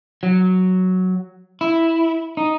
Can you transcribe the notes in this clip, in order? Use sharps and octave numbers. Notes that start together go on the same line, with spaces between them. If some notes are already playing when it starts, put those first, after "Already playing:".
F#3
E4
D#4